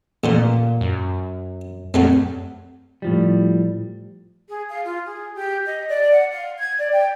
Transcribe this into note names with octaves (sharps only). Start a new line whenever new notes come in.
A1 A#2 D3 C5
F#2
F#2 F#3 A3 C4
A2 F3 G3
G#4
F5
F4
G#4
G4
D#5
D5
F#5
F5
G#6
D5
G5